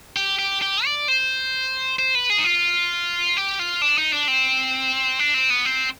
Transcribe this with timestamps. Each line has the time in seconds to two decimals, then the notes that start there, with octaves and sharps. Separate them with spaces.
0.16 G4
0.39 G4
0.62 G4
0.85 D5
1.08 C5
1.99 C5
2.15 B4
2.30 G#4
2.38 D#4
2.44 F4
3.37 G4
3.59 F4
3.82 D4
3.98 D#4
4.13 D4
4.28 C4
5.19 D4
5.34 C4
5.50 B3
5.65 C4